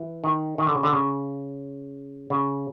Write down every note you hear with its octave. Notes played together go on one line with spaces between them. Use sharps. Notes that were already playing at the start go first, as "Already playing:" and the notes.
Already playing: E3
D#3
D#3
D3
C#3
D3
C#3
C#3